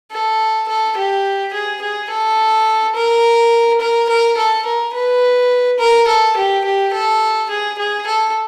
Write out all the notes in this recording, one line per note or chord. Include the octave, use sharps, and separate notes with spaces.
A4
A4
G4
G#4
G#4
A4
A#4
A#4
A#4
A4
A#4
B4
A#4
A4
G4
G4
A4
G#4
G#4
A4